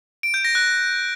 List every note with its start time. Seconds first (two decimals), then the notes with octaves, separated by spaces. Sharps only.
0.23 D7
0.34 G6
0.45 A#6
0.55 F#6